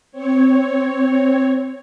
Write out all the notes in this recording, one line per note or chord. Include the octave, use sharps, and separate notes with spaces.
C4 C#5